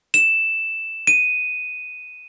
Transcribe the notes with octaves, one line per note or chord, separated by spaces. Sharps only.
E7
D#7